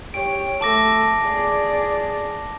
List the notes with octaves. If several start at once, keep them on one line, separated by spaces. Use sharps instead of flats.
G4 C#5 D7
A3 A4 A5 D6 A#6
G#4 D5